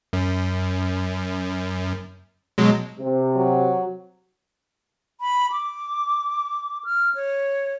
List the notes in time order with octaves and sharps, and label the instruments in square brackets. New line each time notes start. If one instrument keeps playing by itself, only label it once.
[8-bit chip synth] F#2
B2 F#3 G#3
[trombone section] C3
[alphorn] F#3
[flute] B5
D6
F6
C#5